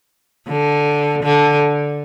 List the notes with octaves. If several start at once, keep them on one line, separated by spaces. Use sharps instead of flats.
D3
D3